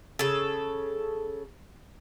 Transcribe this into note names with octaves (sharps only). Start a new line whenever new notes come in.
C#3 A4